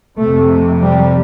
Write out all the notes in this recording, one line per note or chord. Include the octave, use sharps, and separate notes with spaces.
F2 C3 A3
G3